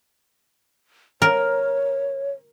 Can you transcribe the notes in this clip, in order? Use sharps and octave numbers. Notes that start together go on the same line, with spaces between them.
A#4 C#5